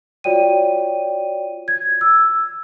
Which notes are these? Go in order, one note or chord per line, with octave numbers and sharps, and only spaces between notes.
F4 F#4 C#5 D5 G5 D#7
G#6
E6